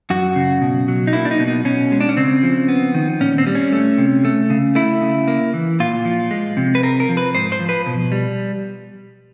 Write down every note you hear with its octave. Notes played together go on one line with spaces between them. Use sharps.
F#2 F#4
C#3
B2
F#3
D#4
A#3 E4
D4
D#4
B2
D#4
B2 C#4
G#3
D4
C#4
C#3 C4
F3
B3
D#3
A#2 C#4
C4
G3
C#4
A3
C3
A3
C#3
A3 E4
C#3
A#3
E3
A#2 F4
F3
G#3
C3
B4
C4 A#4
A#4
F3
B4
G#2 C5
C5
F3
B4
B2
G3